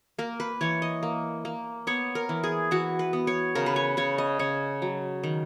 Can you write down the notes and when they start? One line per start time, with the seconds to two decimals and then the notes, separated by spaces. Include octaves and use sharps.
0.18 A#3 A#4
0.40 B4
0.61 E3 C#5
0.82 D#5
1.03 A#3
1.45 A#3
1.87 B3 C#5
2.15 A#4
2.29 E3
2.44 G#4
2.71 E3 F#4
2.99 B4
3.13 B3
3.27 C#5
3.55 C#3 A#4
3.66 B4
3.76 C#5
3.97 C#3 C#5
4.18 D#5
4.39 C#3 C#5
4.82 F#3
5.23 D#3